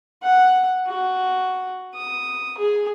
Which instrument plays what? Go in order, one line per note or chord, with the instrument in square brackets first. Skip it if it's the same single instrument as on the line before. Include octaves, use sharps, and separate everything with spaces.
[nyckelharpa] F#5
F#4
D#6
G#4